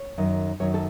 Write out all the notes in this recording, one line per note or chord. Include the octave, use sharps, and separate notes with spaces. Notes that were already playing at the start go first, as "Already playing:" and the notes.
Already playing: C#5
F#2 D#3
F#2 D#3 C#5
A4